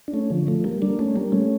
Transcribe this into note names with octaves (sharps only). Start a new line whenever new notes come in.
D4
A3 C#4
D3 F3
F3 A3
G3 A#3
A#3 D4
A3 C#4
G3 A#3
A3 C#4